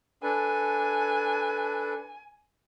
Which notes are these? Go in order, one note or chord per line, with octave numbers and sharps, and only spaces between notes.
D4 A4 B4 G#5